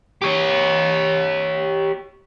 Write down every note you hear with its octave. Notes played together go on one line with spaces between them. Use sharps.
G4 C#5